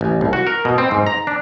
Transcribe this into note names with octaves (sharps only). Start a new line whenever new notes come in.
A1
C2
F#4
A#4
B2
C4
G#2
A#5
D4